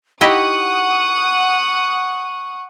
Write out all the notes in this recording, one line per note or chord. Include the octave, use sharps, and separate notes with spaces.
D#4 E4 G4 F#5 C#6 D#6